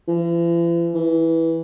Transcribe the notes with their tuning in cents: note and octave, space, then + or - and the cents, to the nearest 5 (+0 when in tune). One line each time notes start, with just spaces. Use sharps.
E3 +45
E3 -10